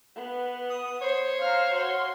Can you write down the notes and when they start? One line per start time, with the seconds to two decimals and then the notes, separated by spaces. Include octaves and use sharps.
0.15 B3 B4
0.69 D#6
1.01 C5 C#5
1.41 F5 A#5 F6
1.72 F#4 C6